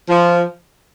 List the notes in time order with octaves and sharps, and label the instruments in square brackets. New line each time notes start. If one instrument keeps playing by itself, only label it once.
[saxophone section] F3